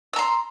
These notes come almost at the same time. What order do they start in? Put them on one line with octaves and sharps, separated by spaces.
E6 A#5 C6